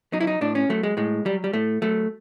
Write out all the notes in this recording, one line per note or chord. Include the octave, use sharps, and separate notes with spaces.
F#3 D#4
E4
D#4
A2 D4
C#4
F#3 A3
G#3
A2 G#3
F#3 G3
G3
A2 A3
F#3 A3